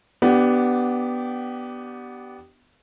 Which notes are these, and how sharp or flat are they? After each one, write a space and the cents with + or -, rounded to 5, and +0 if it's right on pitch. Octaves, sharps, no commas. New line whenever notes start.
B3 +0 D4 +0 G4 -20